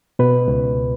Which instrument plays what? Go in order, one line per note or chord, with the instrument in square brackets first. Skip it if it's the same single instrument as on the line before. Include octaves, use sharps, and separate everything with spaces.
[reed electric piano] B2 B4
C#2